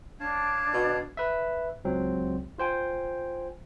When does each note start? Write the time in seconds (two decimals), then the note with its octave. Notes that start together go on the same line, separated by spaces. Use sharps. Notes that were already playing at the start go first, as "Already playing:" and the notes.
0.20 D4 C#5 F5 A5
0.74 B2
1.17 B4 E5
1.85 C#2 F#3 C4
2.58 F4 C5 G5 G#5